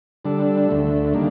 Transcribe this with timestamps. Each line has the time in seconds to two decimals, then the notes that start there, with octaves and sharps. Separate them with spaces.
0.25 D3 G3 D4 A4
0.69 D2 D3 A3
1.14 D#3 G3 A#3 D4